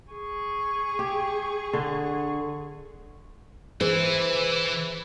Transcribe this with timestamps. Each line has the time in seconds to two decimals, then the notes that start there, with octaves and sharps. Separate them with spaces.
0.12 G#4 C#6
0.99 G4
1.73 D3
3.81 E3 E4 G#4 B4 C5